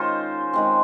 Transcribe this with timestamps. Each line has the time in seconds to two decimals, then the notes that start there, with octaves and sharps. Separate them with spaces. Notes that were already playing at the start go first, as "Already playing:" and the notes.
Already playing: D#3 G#3 C#4 D#4 F4 C5
0.53 D#3 G#3 C4